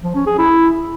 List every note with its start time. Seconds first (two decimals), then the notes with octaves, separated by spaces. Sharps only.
0.03 F3
0.15 C#4
0.27 G#4
0.38 E4